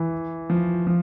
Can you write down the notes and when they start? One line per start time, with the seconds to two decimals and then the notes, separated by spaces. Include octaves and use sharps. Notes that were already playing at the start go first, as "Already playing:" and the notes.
Already playing: E3
0.50 F3
0.87 F3